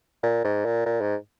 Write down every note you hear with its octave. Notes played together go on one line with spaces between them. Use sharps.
A#2
G#2
A#2
A#2
G#2